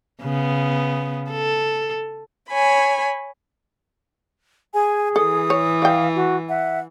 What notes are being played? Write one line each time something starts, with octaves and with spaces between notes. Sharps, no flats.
C#3 B3
A4
C#5 G#5 B5
G#4 G#5
E3 A4 D#6
C#5
D5 F5 G5
F#4
E5 F#5